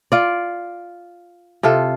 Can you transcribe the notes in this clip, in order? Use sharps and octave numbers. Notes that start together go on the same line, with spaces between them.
F4 D5
C3 F4 A4